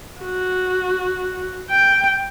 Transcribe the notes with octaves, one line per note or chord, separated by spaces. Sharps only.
F#4
G5